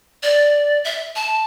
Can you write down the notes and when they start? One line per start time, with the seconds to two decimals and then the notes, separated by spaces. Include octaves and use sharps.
0.23 D5
0.85 E5
1.16 A5